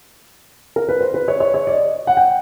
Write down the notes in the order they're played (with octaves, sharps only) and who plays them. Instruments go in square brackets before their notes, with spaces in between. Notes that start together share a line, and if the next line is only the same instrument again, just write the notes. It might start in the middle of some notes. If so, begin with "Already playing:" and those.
[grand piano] A#4
B4
C5
B4
C#5
C#5
C#5
D5
D#5
F#5
G5